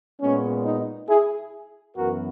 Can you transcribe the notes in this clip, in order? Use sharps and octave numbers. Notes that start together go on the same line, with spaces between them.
A#2 G#3 B3 C#4
D#4
E4 G#4
F#2 E3 B3 F#4 A#4